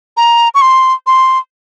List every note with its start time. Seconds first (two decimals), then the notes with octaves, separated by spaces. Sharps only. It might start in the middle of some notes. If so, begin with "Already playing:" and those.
0.17 A#5
0.55 C#6
0.62 C6
1.07 C6